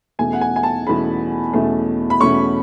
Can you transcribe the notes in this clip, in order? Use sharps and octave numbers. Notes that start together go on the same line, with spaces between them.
E2 B2 A3 C#4 G#5
F#5
G#5
G#5
A5
E2 B2 A3 C#4 B5
E2 B2 A3 C#4
B5
E2 B2 A3 C#4 C#6